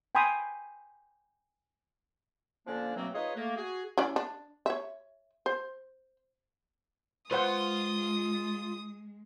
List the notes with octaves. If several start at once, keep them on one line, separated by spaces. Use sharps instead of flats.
G5 G#5 B5 C6 D#6
D3 F3 A#3 C#4 D4
B2 E3 F#3 A3 A#3 C4
D#4 F4 G#4 B4 C#5 D#5
A3 A#3
F#4 G#4
E3 C#4 D5
D4
C#5 E5
C5
G#3 F4 B4 C5 F#5 C6 D#6